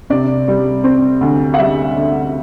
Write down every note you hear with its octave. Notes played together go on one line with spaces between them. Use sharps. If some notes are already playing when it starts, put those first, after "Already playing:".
C3 D5
G3
C4
D2
F#5
G3 E5
D2